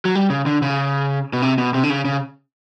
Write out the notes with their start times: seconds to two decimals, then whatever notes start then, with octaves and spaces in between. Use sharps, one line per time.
0.05 F#3
0.15 G3
0.30 C#3
0.46 D3
0.62 C#3
1.33 B2
1.42 C3
1.58 B2
1.74 C3
1.83 D3
1.90 C#3
2.05 C#3